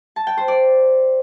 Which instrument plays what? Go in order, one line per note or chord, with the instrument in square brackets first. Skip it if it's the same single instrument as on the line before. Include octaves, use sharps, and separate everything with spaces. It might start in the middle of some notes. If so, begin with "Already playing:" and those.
[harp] A5
G5
C5
D5